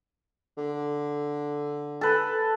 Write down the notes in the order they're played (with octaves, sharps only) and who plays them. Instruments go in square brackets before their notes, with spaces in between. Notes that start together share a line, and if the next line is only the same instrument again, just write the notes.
[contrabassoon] D3
[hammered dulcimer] A4 B4